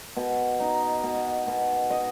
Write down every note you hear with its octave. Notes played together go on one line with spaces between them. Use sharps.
B2
D#4
B2
B2
D#5